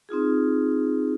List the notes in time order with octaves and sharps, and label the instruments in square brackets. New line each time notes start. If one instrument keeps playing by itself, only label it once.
[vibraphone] C4 D#4 F4 G#4